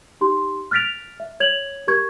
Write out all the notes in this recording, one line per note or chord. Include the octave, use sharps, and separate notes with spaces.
D#4 G4 C6
F6 F#6 A6 B6 D7 F7
E5
C#5 G#6 F7 F#7
G4 A#4 C#6 G#6